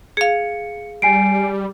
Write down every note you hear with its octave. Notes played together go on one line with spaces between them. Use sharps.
G#4 F5 C#7
G3 G#5 C7 D7